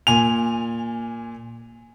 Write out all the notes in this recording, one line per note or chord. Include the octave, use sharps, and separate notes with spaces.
A#2 G#5 F7